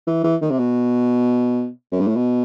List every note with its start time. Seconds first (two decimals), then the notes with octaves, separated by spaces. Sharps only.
0.07 E3
0.24 E3
0.42 D#3
0.50 C3
0.58 B2
1.92 F#2
2.00 G2
2.07 A2
2.16 B2